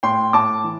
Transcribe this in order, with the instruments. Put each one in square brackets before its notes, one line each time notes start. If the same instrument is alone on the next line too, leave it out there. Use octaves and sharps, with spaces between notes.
[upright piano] A2 G5 C6
A2 A5 D6
E3